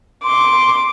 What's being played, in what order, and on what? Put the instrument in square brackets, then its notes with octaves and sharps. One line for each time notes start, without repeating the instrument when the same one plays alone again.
[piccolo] C6 [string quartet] D6